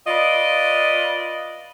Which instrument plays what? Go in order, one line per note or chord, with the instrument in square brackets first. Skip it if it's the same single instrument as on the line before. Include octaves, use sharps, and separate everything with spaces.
[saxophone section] F4 B4 D5 D#5